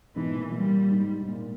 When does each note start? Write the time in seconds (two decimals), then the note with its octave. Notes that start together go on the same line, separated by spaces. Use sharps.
0.16 G#2 B2 E3
0.35 A#2
0.53 A#2 G3
0.90 G#2
1.22 G#2
1.28 A#2